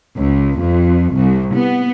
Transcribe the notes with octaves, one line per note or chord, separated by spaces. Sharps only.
C#2
F2
C2
B3